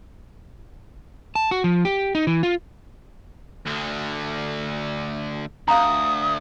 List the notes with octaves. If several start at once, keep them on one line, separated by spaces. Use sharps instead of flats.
A5
F#4
F3
G4
D#4
E3
F4
D2 D3
D2 F5 A#5 D#6